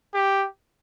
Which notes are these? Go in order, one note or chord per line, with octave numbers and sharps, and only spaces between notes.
G4